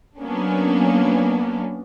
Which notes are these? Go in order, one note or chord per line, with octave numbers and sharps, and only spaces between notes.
F#3 A#3 B3 C#4 D4